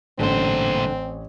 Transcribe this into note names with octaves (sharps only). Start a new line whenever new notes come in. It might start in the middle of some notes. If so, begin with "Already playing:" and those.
A1 G2 A#2 D3 C4 C5